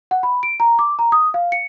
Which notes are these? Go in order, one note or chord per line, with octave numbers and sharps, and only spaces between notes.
F#5
B5
D7
A#5
D6
A#5
D#6
F5
C#7